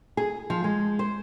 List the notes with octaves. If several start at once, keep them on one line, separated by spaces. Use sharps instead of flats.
G#4
F3
G#3
C5